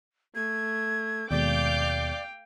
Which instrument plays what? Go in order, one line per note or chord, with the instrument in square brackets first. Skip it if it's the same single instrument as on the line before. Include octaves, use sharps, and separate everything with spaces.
[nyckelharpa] A3 [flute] G#6
[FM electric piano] D#2 B2 G#3 [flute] D5 [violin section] F5 D6 G6 [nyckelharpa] G5